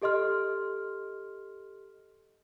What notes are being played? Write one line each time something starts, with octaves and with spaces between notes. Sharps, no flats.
G4 A4 D#5 C6 F6